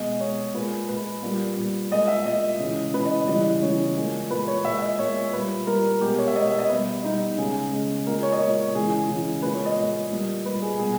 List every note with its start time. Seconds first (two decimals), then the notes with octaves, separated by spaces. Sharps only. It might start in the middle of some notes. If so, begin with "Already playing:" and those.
Already playing: B2 G#3 D#5
0.20 B2 G#3 C#5
0.54 A#2 G#3 B4
0.89 A#2 G#3 B4
1.23 A#2 G3
1.57 A#2 G3
1.91 A#2 G#3 D#5
2.08 E5
2.25 A#2 G#3 D#5
2.60 C#3 E3 G#3
2.94 C#3 E3 G#3 B4
3.05 D#5
3.28 C#3 E3 G3 D#5
3.62 C#3 E3 G3 C#5
3.96 A#2 G#3
4.30 A#2 G#3 B4
4.48 C#5
4.65 A#2 G#3 E5
4.82 D#5
4.99 A#2 G#3 C#5
5.33 A#2 G3 B4
5.67 A#2 G3 A#4
6.01 B2 G#3 G4
6.10 A#4
6.18 C#5
6.27 E5
6.36 B2 G#3 D#5
6.47 E5
6.58 D#5
6.69 B2 G3 B4
7.04 B2 G3 D#4
7.37 C#3 G#3 G#4
7.72 C#3 G#3
8.07 A#2 G#3 A#4
8.23 C#5
8.32 D#5
8.40 A#2 G#3 C#5
8.74 C#3 E3 G#3 G#4
9.09 C#3 E3 G#3
9.42 A#2 G#3 B4
9.54 C#5
9.65 D#5
9.77 A#2 G#3
10.11 A#2 G3
10.45 A#2 G3 B4
10.62 G#4
10.79 B2 G3 G#4